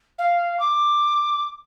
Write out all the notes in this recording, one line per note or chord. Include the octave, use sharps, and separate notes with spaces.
F5
D6